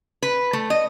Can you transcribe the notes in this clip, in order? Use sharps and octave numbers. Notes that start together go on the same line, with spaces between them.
B4
A3
D#5